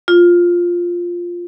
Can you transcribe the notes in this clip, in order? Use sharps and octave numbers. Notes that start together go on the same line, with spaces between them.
F4